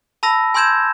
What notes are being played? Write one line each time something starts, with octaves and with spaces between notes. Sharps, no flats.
A5 B5 E6 A#6
G#5 C6 E6 G6 G#6 E7